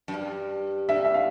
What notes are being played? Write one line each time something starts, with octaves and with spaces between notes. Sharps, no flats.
F#2
G2
G2 E5
E5
F5